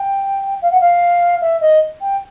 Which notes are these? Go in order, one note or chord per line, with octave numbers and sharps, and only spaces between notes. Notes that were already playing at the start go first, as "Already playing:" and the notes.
Already playing: G5
F5
F#5
F5
E5
D#5
G5